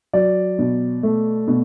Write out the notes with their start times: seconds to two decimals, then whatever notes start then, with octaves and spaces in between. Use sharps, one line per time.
0.13 F#3 D5
0.59 B2
1.03 A3
1.48 B2